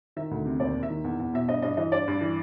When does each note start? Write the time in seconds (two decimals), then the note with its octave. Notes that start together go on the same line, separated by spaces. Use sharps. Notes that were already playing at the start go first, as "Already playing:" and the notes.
0.16 D#3 E5
0.31 D2
0.45 C3
0.60 D#2 D5
0.75 D#2
0.83 E5
0.90 D#3
1.04 E2
1.20 E2
1.33 B2 E5
1.49 G2 D#5
1.62 G2 D#5
1.77 E3 D#5
1.92 G2 D5
2.08 G2
2.21 E3